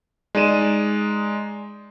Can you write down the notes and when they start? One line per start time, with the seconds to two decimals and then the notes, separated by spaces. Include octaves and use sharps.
0.35 G#3 D#4 D5 D#7 E7